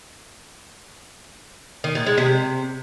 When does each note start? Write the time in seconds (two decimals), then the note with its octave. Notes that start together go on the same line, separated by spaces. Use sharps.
1.84 D#3
1.95 A#2
2.06 G#3
2.18 C3